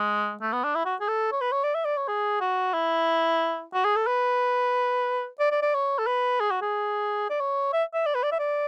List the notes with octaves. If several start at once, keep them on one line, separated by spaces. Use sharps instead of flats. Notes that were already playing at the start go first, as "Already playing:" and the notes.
Already playing: G#3
A3
B3
D4
E4
F#4
G#4
A4
C#5
B4
C#5
D5
E5
D5
C#5
G#4
F#4
E4
F#4
G#4
A4
B4
D5
D5
D5
C#5
A4
B4
G#4
F#4
G#4
D5
C#5
E5
E5
D5
B4
D5
E5
D5